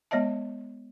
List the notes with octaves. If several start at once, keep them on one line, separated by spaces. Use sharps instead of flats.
G#3 B3 C#5 D#5 E5 A5